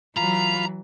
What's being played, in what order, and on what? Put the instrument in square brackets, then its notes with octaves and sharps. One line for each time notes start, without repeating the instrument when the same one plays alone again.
[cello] E3 F#3 [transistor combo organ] F4 B5 [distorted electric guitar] A#5